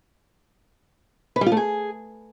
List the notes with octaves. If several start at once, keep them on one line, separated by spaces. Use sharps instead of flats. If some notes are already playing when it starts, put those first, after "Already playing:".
B4
G3
F4
A3
G#4